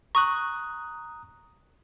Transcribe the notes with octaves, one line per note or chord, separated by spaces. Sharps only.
A#5 C#6 D#6 F#6